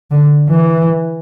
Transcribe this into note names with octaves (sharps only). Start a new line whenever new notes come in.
D3
E3